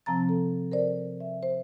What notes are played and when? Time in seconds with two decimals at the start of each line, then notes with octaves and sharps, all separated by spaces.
0.06 C3 F3 C4 A5 A#5 A6
0.29 A4
0.72 A#4 C5 D5
1.20 E5
1.43 C5